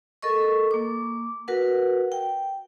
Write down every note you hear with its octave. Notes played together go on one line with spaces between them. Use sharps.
A4 A#4 D#5 C#6
A#3 D6
F#4 A#4 B4 F#5
G5